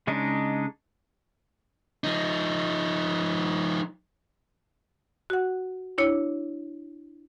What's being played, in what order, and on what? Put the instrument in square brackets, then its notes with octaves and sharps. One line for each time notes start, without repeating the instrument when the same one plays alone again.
[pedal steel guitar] C#3 G#3 D4 D#4
[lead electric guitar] F3 D#4
[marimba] F#4 F#5
D4 E4 C#5